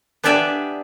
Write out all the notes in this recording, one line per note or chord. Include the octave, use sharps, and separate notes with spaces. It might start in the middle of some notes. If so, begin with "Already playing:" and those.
B3 D4 G4 D5 E5 G#5